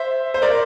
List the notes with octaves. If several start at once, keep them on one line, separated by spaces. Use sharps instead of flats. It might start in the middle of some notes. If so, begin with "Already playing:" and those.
Already playing: C5 E5
C5
A#4 D5